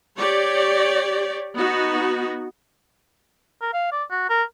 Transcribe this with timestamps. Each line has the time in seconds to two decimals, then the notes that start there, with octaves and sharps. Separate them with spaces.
0.17 G4 C#5 D5
1.56 B3 D#4 F#4
3.61 A#4
3.73 F5
3.92 D5
4.11 F#4
4.30 A#4